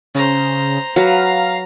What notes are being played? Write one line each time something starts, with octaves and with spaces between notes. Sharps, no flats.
C#3 C5 A#5
F#3 B4 F5 A#5